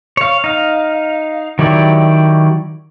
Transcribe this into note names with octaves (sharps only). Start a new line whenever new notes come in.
C#5 F5
D#4 F5
D#3 F#3 E4 G4 D5